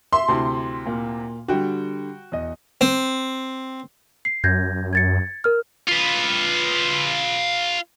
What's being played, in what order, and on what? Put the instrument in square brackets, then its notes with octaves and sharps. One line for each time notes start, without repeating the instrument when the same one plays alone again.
[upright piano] E5 [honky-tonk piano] C6
[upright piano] D2 C3 E4 [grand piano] A5
[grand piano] A#2 A#3
[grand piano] D3 G3 [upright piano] F#4 G5
[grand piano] E2 D#5
[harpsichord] C4
[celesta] C7
[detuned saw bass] F#2 [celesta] G6 G#6 A#6
[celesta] G#6 A6 C#7
A#4 F6
[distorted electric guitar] F4 B4